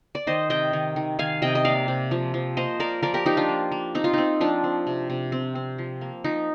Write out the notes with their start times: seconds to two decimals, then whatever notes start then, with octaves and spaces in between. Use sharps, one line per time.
0.15 D5
0.27 D#3 C5 D#5
0.50 C3 D#5 G5
0.73 D#3
0.96 D#3
1.19 D#3 F5 G#5
1.42 C3 D#5 G5
1.55 D#5
1.65 A#3 D5 F5
1.88 C3
2.11 F3
2.34 F3
2.57 A#3 C5 D#5
2.80 A#3 A#4 D5
3.02 F3 A#4 D5
3.14 G4 A#4
3.26 F3 D#4 G4
3.37 D4 F4
3.48 A#3
3.72 A#3
3.95 C4 D#4
4.04 F4
4.13 C4 D#4
4.41 F3 D4
4.64 C4
4.87 C3
5.10 C3
5.32 C4
5.55 C4
5.78 F3
6.01 A#3
6.24 F3 D#4